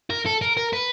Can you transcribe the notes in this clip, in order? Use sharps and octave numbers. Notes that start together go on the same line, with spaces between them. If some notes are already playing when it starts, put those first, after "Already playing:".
A#4
A4
A#4
A#4
B4